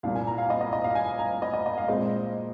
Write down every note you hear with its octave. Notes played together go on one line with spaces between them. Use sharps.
C2 A#2 A#3 F5
G#5
A#5
F5
D#5
D#5
D#5
F5
G#5
A#5
D#5
D#5
D#5
F5
A#2 G#3 C4 D#5